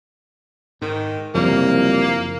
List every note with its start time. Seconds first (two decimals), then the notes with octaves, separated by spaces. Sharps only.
0.82 G#2 D#3
1.35 F#1 C2 F#2 C#3 F3 A#3